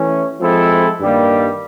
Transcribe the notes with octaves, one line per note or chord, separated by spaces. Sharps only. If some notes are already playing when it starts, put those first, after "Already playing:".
Already playing: E3 A3 C#4
F3 G#3 C4 E4 A4
G2 D#3 G3 A#3